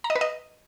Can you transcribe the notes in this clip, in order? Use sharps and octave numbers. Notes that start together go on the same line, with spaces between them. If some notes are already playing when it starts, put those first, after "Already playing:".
A#5
D#5
B4
D#5